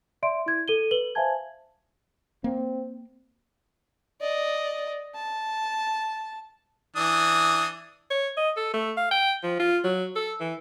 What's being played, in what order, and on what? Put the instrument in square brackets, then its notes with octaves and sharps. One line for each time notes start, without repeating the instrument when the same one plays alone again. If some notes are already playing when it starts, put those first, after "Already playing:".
[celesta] D5 E5 C6 D7
E4 G#6
A4 D#7 G7
B4 F#7 G7
C5 E5 F5 G#5 A5 G#6
[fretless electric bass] A#3 [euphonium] C4
[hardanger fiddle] D5 D#5
A5
[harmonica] E3 D4 D#6
[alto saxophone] C#5
D#5
A4
A3
F5
G5
F3
F4
F#3
A4
E3